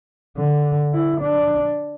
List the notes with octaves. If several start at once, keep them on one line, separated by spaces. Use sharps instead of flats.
D3
E4
D4